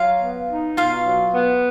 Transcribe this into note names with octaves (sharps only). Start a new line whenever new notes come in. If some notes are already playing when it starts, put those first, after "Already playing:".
Already playing: F#3 F4 F5
B3
D#4
B2 F4 F5
F#3
B3